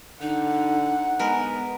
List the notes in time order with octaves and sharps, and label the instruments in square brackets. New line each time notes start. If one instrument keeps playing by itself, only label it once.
[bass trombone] D3 [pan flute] D#4 [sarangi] F#5
[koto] G#3 A#4 B4 [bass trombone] B3